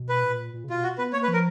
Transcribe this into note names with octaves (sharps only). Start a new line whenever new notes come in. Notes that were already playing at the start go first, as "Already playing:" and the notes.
Already playing: B2
B4
A#2
A#2
C#3
B2 F4
F#4
B3 B4
A#3 C#5
B4
F3
A#4